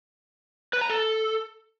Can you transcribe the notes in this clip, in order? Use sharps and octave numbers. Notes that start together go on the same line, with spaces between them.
B4
A#5
A4